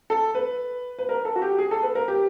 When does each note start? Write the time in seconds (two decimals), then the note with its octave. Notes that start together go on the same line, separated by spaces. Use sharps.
0.10 A4
0.35 B4
0.99 B4
1.09 A#4
1.25 A4
1.36 F#4
1.42 G4
1.58 G#4
1.71 A4
1.83 B4
1.95 A#4
2.08 G4